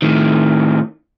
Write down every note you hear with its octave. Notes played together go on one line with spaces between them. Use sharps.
A2 D#3